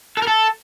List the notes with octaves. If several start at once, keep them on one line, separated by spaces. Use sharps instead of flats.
A4
A#4
A4